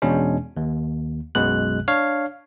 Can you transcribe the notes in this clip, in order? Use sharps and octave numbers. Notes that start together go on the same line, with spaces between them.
E2 B2 G#3 C#4 D4
D#2
B1 F#2 B2 G#3 F#6
D4 C#5 F5